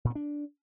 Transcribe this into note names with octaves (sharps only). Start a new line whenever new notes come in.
A#2
B3
D4